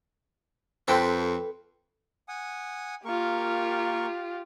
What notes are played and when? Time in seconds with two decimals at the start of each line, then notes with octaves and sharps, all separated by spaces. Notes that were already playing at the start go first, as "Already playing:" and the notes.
0.88 F2 C4 A4 B4 G5
2.28 F#5 G#5 D#6
3.05 A#3 F4 G4 A#4 C#6